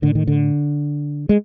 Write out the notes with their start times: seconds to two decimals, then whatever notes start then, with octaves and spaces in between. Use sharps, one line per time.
0.02 A2 D3
0.15 D#3
0.27 D3
1.29 G#3